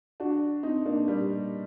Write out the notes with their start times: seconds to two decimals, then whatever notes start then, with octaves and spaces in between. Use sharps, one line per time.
0.20 D4 F#4
0.63 C4 D#4
0.85 A#3 D4
1.07 G3 A#3